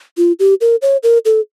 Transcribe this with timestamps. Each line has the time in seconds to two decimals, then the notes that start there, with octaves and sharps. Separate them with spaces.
0.17 F4
0.39 G4
0.61 A#4
0.82 C#5
1.03 A#4
1.25 A4